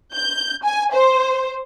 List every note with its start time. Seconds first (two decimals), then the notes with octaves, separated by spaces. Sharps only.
0.14 G6
0.64 G#5
0.93 C5